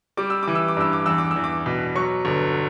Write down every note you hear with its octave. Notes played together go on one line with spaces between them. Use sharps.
G3 D6
E6
E3 D6
E6
D6
G2 E6
D6
E2 E6
D6
E6
E2
D6
B2
F#3 C#6
G1